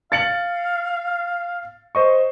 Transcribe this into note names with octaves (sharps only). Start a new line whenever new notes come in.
F5 A6 C#7 F#7
C5 D#5 C#6